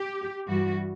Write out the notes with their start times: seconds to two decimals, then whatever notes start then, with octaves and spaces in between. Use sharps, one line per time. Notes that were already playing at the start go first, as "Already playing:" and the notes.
Already playing: G4
0.47 G2 E3 G3 F#4